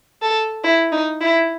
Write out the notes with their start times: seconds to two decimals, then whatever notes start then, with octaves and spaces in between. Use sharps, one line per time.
0.22 A4
0.64 E4
0.92 D#4
1.21 E4